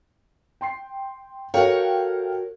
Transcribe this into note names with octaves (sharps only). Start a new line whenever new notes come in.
G5 C6 C7
F#4 A4 A#4 C#5 F5 G5